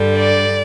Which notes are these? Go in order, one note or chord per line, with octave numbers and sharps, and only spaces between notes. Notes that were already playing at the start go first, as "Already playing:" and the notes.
Already playing: G2 D3 G3
D5